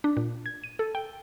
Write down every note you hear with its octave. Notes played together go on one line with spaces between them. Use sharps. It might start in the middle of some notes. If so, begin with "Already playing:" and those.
D4
A#2
G#6
D#7
A4
G5